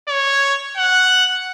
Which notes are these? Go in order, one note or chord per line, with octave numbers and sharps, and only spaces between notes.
C#5
F#5